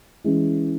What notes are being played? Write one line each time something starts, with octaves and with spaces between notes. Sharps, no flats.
E3 G#3 C#4